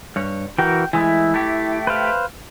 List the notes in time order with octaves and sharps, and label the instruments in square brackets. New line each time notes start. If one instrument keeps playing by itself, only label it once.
[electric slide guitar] G2 C#5
[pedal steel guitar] E3 F#4 A#4 [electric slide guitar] G5
[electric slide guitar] E3 G#3 A3 [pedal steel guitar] E4
[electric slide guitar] A3 G4
[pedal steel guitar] B4 C5 F5